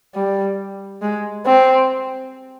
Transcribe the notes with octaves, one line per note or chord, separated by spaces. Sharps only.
G3
G#3
C4